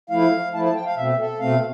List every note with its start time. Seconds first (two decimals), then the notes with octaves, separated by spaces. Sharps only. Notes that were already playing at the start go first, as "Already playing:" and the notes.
0.10 F3 A3 E4 F5
0.54 F3 A3 E4 A5
0.65 A5
0.75 G5
0.85 F5
0.96 B2 A3 C4 E5
1.19 A4
1.39 B2 A3 C4 F5